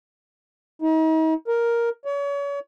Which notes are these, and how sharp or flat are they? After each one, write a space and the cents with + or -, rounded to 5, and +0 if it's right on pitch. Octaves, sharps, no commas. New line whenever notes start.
D#4 +40
A#4 +5
C#5 +35